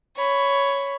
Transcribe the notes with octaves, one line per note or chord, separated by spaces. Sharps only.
C#5 B5